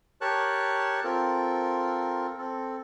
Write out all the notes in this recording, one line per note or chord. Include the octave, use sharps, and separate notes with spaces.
G4 A#4 C#5 A5 C#6 F#6
C4 F4 A4 A#4
C4 A4